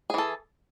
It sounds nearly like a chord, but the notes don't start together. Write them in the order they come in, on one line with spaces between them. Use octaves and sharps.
G#4 E3 A4